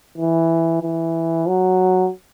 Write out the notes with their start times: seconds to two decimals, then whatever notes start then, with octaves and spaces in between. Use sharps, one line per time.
0.18 E3
0.82 E3
1.47 F#3